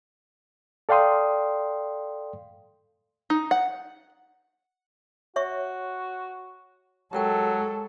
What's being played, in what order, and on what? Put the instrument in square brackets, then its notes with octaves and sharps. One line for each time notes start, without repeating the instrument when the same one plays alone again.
[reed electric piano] A4 D5 F5 G5 C6 D#6
[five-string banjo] D#4
F#5
[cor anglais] F#4 [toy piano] C#5 E5 C#6
[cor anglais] F#3 [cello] G#3 A4 [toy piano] G4 A#4 G5